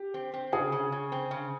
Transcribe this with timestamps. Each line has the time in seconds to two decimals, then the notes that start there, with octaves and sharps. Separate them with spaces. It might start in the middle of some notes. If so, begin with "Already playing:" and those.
Already playing: G4
0.14 C4
0.34 C4
0.52 C#3 G#4
0.72 C#3
0.92 C#3
1.12 C4
1.31 C#3